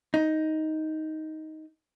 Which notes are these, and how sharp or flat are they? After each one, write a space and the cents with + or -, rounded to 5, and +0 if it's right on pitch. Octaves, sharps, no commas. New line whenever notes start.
D#4 +10